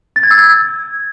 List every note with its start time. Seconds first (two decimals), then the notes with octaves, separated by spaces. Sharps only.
0.16 A6
0.23 G#6
0.31 E6
0.38 G#6